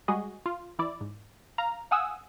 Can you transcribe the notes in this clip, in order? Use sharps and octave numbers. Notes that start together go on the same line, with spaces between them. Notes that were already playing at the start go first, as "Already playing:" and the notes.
G3 G#3 F#4 G#4 D#5
F4
E3 E4 D5
G#2
F5 A#5
F5 F#5 G#5 D#6 E6